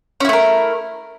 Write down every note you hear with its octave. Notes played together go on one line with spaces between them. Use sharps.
A3 C#4 E4 A#4